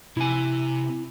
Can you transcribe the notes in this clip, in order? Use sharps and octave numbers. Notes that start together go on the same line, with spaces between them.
C3 E4 G#5